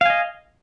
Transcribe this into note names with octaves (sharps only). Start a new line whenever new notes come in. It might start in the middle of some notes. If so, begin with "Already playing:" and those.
D#5 F5 G#5